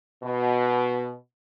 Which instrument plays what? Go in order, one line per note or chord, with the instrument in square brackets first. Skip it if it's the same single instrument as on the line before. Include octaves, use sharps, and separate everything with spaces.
[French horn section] B2